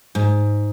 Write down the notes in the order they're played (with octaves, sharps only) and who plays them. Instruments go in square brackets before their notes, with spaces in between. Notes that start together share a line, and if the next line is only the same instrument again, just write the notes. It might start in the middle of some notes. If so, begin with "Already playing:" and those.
[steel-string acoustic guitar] G#2